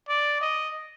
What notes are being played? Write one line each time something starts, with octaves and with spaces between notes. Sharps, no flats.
D5
D#5